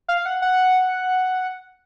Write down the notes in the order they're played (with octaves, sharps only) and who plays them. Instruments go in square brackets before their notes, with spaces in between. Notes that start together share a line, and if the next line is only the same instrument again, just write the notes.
[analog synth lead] F5
F#5
F#5